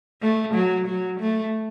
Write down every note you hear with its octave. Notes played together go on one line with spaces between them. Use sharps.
A3
F#3
F#3
A3